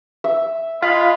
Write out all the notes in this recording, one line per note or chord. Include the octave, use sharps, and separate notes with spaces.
E5
G#3 F4 B5